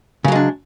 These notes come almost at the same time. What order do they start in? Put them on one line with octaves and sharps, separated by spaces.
C#3 F#3 G#3 D4